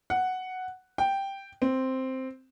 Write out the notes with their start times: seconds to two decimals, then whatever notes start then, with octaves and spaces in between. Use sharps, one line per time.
0.10 F#5
0.98 G5
1.62 C4